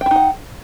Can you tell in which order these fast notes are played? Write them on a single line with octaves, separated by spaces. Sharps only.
G5 E4 D#4 F#5